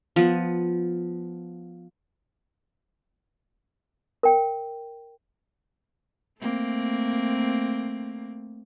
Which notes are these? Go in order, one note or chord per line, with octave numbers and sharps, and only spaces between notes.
F3 B3
A#4 G5
A3 A#3 C4